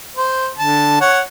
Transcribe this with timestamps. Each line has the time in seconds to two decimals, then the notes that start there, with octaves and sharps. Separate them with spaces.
0.17 C5
0.58 D3 A5
1.01 C#5 F#5